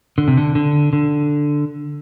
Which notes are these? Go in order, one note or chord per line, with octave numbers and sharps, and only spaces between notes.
D3
C3
D3
D3
D3